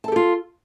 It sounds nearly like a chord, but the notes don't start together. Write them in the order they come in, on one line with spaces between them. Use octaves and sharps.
A5 A4 G4 F4